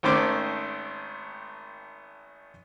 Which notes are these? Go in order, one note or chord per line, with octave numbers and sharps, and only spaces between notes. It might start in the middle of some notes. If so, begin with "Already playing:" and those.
G#1 D#3 A3 C#4 C5 D6